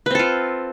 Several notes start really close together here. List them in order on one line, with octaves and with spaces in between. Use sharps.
B4 C4 A4 F4